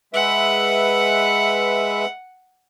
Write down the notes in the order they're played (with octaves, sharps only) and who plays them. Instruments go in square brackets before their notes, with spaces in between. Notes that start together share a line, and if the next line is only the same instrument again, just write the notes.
[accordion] G#3 B4 E5 [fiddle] F#5